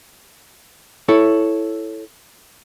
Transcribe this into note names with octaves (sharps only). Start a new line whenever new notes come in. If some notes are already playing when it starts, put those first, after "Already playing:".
E4 A4 C#5